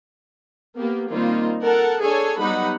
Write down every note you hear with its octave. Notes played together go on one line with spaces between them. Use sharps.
A#3 B3 G4
D#3 G3 A#3 C4 D#4 F4
A4 A#4 F#5 A5
D4 G#4 A4 C#5 G#5
F#3 G3 B3 D#4 F#5 B5